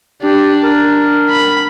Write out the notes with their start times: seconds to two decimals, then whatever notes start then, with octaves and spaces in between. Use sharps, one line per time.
0.22 D4 G4
0.63 A#4
1.30 B5